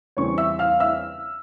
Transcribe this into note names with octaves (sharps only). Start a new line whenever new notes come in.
E2 C#3 G3 C4 C#5 C#6
E5 E6
F5 F6
E5 E6